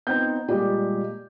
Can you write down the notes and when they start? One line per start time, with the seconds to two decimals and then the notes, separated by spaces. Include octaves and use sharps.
0.07 B3 C4 D#4 G6
0.48 A#2 G3 G#3 G4